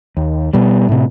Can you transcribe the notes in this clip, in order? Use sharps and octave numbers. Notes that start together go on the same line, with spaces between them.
D#2
B2 G3
A2 C3